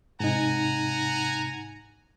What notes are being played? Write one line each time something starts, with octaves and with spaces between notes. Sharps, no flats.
G#2 C3 D#4 F#5 G#5 A#5